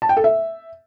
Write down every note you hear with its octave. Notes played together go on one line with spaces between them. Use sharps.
A5
G5
A4
E5